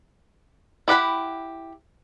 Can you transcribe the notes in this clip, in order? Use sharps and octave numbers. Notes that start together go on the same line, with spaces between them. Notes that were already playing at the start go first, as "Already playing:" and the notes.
E4 G4 F#5 B5